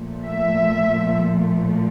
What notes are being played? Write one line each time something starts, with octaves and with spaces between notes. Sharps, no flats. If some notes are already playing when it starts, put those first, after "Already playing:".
Already playing: A#2 F3 A3
E5